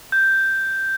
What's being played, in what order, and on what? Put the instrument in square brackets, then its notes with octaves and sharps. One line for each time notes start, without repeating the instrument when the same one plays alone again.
[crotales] G6